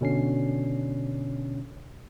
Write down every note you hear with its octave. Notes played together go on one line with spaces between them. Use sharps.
B2 D3 C#4 D4 C7